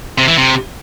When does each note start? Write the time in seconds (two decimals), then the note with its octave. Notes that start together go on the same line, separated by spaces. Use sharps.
0.18 C3
0.28 E3
0.38 C3